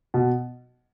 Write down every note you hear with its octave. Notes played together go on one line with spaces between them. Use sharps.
B2